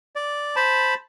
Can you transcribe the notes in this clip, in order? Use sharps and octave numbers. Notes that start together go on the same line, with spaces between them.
D5
C5 A5 B5